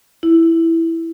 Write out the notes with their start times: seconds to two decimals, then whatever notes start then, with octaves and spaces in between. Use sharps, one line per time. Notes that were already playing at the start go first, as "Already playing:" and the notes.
0.23 E4